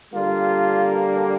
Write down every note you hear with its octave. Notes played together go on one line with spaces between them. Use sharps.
D3 G3 A#3 F4